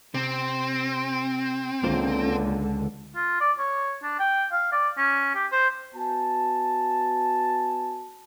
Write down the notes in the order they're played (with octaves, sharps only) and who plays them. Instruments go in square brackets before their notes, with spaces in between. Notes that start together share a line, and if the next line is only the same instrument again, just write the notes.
[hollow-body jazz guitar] C3 [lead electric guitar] C4
[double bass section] C#2 D3 [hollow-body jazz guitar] A#3 F4 C5
[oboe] F4
D5
C#5
D4
G5
F5
D5
C#4
G4
C5
[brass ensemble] B3 F#4 G#5 A5